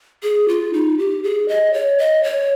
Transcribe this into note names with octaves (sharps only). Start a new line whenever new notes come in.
G#4
F4
D#4
G4
G#4
D#5
C#5
D#5
C#5